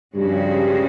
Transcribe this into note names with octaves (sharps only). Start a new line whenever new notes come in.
G2 C#3 F3 G#3 C#4 F#4